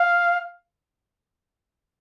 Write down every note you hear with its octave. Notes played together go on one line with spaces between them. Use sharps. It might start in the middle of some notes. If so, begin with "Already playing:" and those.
Already playing: F5